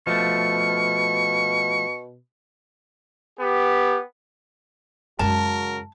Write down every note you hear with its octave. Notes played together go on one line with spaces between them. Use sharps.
B2 F3 A3 C#6
B3 G4
F#2 C#3 G#3 F#4 A#4 A5